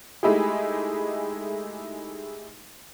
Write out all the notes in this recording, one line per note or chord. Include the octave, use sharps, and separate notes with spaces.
G#3 A3 D#4 E4 G4 G#4